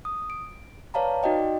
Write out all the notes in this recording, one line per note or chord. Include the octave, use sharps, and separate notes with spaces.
D#6
D7
B4 C#5 D5 F5 A5 A#5
D#4 F#4 D5 D#5 G5
D5